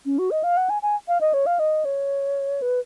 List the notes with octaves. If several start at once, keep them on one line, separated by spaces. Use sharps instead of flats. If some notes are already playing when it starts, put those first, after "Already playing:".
C#4
F#4
D#5
F5
F#5
G#5
G#5
F5
D#5
C#5
F5
D#5
C#5
B4